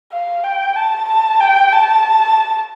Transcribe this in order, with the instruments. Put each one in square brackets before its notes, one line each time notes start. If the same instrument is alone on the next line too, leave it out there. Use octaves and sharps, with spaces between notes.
[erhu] F5
G5
A5
A5
G5
A5